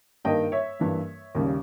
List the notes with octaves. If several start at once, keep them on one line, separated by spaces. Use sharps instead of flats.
G2 D#3 A#3 D#5 G5
C#5 E5
G2 E3 A#3
D#2 C#3 G3